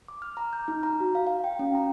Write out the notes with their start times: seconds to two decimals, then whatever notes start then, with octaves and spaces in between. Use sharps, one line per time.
0.08 D6
0.22 F6
0.37 A#5
0.53 G6
0.68 D#4
0.83 A#5
1.00 F#4
1.15 F5
1.27 F5
1.44 G5
1.59 C#4
1.75 A#5